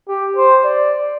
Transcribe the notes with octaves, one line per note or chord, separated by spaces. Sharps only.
G4
C5
D5